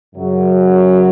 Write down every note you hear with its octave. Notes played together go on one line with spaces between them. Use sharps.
F#2 C#3 F#3